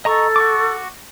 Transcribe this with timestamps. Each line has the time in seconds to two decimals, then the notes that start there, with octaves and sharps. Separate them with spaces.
0.05 A4 D#5 A#5 C#6
0.36 F#4 C#6 D6